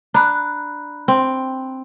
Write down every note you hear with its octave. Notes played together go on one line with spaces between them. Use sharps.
D4 A#5 B5 F#6
C4